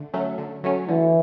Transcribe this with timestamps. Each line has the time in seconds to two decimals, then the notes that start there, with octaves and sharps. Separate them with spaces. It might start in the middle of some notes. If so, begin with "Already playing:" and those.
Already playing: D3 A3
0.13 F#3 A3 C#4
0.38 D3
0.64 F#3 A3 C#4
0.89 D3 E3